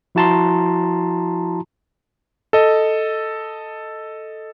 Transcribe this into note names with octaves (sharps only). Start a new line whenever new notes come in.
F3 E4 F#4 A5 A#5 C6
A4 D#5